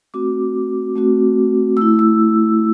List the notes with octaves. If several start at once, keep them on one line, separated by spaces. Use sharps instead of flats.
A3 C4 F#4 D6
A3 C4 F#4
A3 E4 E6
E6